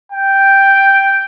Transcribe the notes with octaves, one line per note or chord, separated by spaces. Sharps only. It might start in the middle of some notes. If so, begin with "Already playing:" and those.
G5